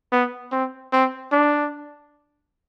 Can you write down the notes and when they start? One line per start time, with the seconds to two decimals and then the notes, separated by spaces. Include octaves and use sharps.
0.12 B3
0.52 C4
0.93 C4
1.32 D4